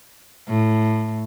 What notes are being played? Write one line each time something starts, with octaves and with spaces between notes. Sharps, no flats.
A2